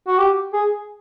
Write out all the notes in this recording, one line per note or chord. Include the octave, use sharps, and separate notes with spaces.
F#4
G4
G#4